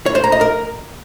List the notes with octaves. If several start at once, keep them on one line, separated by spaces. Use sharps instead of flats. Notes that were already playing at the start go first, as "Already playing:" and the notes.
C#5
C5
A#5
D#5
A#4